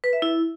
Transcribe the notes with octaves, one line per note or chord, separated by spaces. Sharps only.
B4
E5
E4